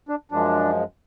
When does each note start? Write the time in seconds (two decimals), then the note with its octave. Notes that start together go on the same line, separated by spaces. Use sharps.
0.09 D4
0.32 F#2 F3 G#3 D4